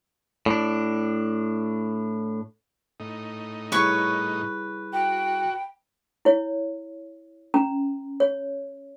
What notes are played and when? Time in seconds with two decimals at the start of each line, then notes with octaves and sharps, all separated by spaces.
0.46 A2 D4
3.00 A2 D#4
3.72 G3 E4 G#4 B4 C#5 C#6
4.93 F#4 G5
6.25 E4 C#5
7.54 C#4 A#5
8.20 C#5